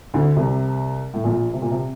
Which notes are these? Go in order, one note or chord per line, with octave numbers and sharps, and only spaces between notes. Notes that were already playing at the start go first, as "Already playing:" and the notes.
D2 D3
C2 C3
A2
A#1 A#2
C3
A#2
C3